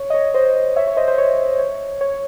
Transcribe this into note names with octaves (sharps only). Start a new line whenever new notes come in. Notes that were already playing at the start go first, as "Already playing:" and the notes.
Already playing: C#5
D#5
C#5
C5 D#5
C#5 E5
C#5
C5 D#5
C5
C#5
C#5
C#5